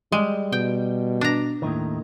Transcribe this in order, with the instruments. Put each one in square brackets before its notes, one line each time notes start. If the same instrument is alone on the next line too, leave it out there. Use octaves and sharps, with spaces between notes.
[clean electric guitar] G3 [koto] G#3
[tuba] B2 [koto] G5
[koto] D4 A#5
[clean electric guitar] D#2 A2 D#3